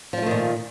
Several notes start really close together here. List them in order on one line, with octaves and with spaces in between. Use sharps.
F3 G3 A3 D#3 A#2